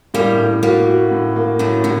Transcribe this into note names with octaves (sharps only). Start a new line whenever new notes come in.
A2 G3 A#3
A2
G3 A#3 F#4
F#4
A2
A#3
A2 F#3 A3
A2 D3 F#3